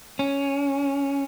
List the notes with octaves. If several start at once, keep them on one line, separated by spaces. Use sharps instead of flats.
C#4